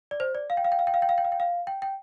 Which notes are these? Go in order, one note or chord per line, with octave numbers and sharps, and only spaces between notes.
D5
C5
D5
F5
G5
F5
G5
F5
G5
F5
G5
F5
G5
F5
G5
F5
G5
G5